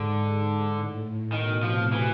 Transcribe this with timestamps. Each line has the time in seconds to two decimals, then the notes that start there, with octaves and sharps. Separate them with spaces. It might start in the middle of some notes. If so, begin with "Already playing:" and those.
Already playing: G#2 D3
0.73 A2
1.32 B2 D#3
1.62 C3 F3
1.92 E3